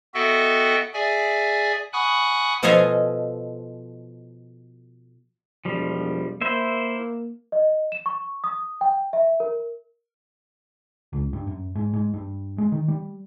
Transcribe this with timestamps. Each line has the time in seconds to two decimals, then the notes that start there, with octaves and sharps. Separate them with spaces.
0.14 B3 F#4 A4 D#5 E5 G5
0.94 G#4 D5 E5 G#5
1.93 F#5 G#5 B5 C#6 D#6 F#6
2.63 B2 F3 A4 D#5 F5 G#5
5.65 E1 F3 G3
6.41 A#3 E4 C5 E5
7.52 D#5
7.92 E7
8.06 C#6
8.44 D#6
8.81 G5
9.13 E5
9.40 A#4
11.13 C#2
11.33 G2
11.47 F#2
11.75 G#2
11.93 G#2
12.14 G2
12.58 G#3
12.72 D#3
12.88 G3